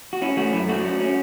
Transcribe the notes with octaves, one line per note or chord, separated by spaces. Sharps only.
F#4
C#4 E4
A3 F#4
F#2 E4
A3 F#4
C#4
C#4